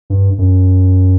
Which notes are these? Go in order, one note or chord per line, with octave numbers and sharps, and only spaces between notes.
G2
F#2